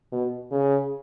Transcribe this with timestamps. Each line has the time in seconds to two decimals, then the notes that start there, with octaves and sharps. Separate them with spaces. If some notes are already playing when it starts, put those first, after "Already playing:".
0.12 B2
0.51 C#3